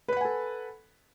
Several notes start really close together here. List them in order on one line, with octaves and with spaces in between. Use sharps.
B4 B5 F#5 G#5 A4